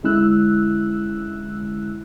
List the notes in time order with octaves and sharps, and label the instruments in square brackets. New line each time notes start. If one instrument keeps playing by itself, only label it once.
[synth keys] D3 G#3 C#4 E4 E6 F#6